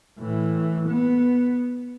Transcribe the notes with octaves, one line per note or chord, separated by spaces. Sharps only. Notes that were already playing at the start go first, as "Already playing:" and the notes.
A2 E3
B3